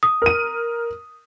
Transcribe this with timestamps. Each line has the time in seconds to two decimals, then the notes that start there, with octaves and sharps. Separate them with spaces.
0.03 D#6
0.22 A#4 D#7